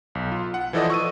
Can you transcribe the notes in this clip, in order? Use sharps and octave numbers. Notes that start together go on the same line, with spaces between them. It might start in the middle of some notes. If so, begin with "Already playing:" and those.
B1
F4
F#5
E3 F3 E4 A4 D5 D#5
C#6 E6 D#7